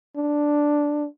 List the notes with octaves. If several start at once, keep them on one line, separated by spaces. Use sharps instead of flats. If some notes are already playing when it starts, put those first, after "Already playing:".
D4